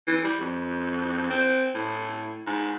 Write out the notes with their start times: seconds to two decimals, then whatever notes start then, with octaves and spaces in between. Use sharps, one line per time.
0.07 E3
0.24 G3
0.41 F2
1.30 C4
1.75 A2
2.47 G#2